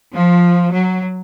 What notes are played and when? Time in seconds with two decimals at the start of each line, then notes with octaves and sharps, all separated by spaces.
0.14 F3
0.72 F#3